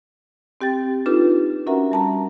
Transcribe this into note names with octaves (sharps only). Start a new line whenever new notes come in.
C4 G4 G5 A6
D4 D#4 F4 G4 A4 B4
C#4 F#4 A#4 E5 F#5 A#5
G3 A5 A#5